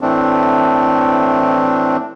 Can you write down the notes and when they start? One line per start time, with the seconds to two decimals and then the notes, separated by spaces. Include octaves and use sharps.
0.01 A2 E3 A3 C4 D4